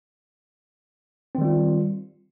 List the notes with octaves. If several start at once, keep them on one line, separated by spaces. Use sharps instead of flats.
D#3 G3 C4 F4